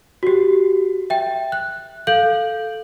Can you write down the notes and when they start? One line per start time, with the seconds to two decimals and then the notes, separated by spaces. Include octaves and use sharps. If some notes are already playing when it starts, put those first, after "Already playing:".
0.23 F#4 G4
1.10 E5 G5
1.52 F#6
2.07 A4 F5 G6 F#7